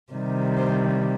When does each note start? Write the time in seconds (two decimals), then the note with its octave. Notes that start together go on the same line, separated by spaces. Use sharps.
0.13 C3 D#3 G3
0.57 C5